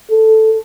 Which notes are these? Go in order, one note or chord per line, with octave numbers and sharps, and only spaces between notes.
A4